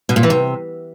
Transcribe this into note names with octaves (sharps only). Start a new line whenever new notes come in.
B2
A#2
E3
C3